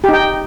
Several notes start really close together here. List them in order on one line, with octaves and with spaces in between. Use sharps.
G4 D#4 G5